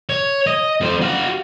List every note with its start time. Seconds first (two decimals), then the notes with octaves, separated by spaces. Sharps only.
0.09 C#5
0.47 D#5
0.81 F2 C5
1.02 F#4 F5